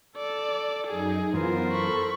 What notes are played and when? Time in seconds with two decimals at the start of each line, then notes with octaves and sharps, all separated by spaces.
0.17 A4 D5
0.87 F#2 D#4 G#4
1.34 F#2 E3 B3 F4 A#4 C5
1.72 A4 B5 C#6